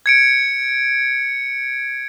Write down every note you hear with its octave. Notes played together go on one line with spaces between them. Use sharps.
G#6 C#7 D7